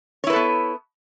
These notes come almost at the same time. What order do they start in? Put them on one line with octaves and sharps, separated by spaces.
C#5 E4 B4 A4 B3